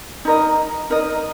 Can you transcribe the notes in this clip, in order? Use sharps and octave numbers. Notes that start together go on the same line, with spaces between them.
D#4 A#4 D#5
D#4 A#4 D#5